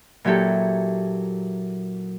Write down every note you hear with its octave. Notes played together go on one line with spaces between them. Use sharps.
A#2 F#3 E4 G4 A4